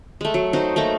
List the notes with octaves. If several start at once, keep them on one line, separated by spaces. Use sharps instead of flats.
G#3 A3
F#3
D#4 F#4 C5
A3 A#3 D#4 A#5